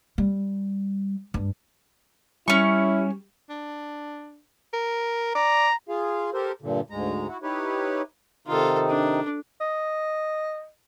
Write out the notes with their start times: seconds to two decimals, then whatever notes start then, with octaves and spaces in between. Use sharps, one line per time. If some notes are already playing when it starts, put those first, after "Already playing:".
0.18 G3
1.34 G2
2.48 G3 C#4 E4 C#6
3.49 D4
4.73 A#4
5.35 D5 A#5
5.89 F4 G#4 F5
6.34 G4 A4 A#4 C5
6.62 G2 A#2 D3
6.90 D2 G#2 G#3 A#5
7.27 E4 F#4
7.43 D#4 E4 G4 B4 C#5
8.47 C3 D#3 D#4 F4 A4
8.89 D4
9.61 D#5